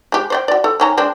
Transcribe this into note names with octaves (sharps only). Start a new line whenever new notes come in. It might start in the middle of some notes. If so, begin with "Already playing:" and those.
G#3 G4
C5 D5 G5
F#4 D5
A4
D#3 C#4 A#5
G#3 C4 D4